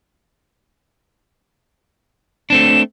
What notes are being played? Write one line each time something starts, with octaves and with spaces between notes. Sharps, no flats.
A3 C4 D4 E7